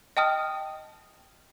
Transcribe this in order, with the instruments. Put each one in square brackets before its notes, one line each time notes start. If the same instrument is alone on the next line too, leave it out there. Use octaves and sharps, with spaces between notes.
[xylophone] D#5 G5 A5 D#6 F6